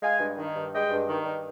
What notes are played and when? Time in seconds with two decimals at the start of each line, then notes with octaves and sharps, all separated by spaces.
0.03 G#3 F5 G#5
0.20 G2
0.38 D#3
0.55 G2
0.73 G#3 D#5 G5
0.90 G2
1.08 D#3
1.25 G2